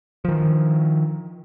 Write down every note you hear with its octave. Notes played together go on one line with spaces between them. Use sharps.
D#3 F3